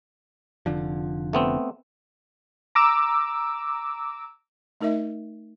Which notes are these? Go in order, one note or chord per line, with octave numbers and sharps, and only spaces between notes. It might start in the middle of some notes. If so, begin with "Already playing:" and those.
F1 D3 F3
A3 B3 C4
A#5 D6 E6
A3 D#4 A#4 D#5 E5